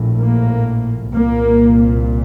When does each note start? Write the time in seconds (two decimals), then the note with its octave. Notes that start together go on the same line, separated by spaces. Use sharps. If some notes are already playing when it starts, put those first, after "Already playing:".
Already playing: A#1 A2
0.18 A#3
1.15 C2 A#2 A#3